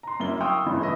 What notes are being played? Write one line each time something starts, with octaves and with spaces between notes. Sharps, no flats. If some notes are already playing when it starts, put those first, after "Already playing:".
A#5 C6
G1 F#2 A#3 E4 G7
F5 G5 C6 C#6 D#6 E6
F#1 C#2 G2 E3
A3 B4 D#5 E5